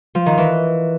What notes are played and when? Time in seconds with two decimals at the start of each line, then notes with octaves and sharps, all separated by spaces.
0.15 F3
0.26 D#3
0.38 E3